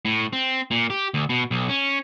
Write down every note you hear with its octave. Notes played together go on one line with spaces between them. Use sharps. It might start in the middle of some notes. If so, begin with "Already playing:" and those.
A2
C4
A#2
G4
D2
B2
B1
C#4